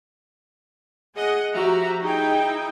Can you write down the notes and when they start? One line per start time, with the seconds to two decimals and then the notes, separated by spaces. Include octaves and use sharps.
1.16 G#4 D#5 F#5
1.54 F3 F#4 G4 E5 A#5
2.01 D#4 E4 G#4 D#5 G5